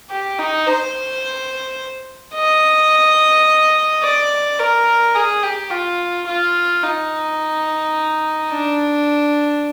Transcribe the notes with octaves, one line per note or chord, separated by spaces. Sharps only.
G4
D#4
C5
D#5
D5
A#4
G#4
G4
F4
F4
D#4
D4